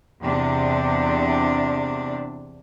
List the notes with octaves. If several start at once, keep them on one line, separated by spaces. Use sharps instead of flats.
E2 C3 D4